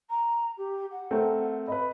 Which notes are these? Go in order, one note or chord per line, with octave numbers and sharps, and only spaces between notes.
A#5
G4
F#5
A3 C4 A#4
B4 D#5 B5